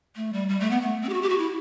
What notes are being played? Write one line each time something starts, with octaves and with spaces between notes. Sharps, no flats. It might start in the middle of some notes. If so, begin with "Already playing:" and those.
A3
G3
G3
A3
B3
A3
C4
G4
F#4
G4
F#4
E4